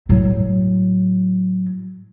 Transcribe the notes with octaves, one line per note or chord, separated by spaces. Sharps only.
A2 F#3